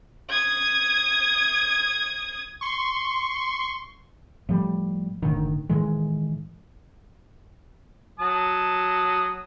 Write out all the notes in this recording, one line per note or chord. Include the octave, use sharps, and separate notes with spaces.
D#6 G#6
C6 C#6
A2 F3 G3
F#1 A2 D3 D#3
A2 D#3 E3 G#3
F#3 A5 D#6